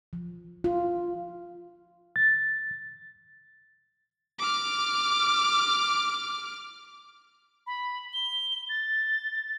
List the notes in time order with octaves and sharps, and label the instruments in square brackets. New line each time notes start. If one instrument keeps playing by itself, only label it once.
[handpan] F3
F4
[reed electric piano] A6
[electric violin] D6 F6
[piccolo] B5
G7
A6